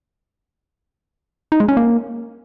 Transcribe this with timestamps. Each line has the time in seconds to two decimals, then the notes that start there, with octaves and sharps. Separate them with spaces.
1.52 D#4
1.60 G#3
1.69 C#4
1.77 A#3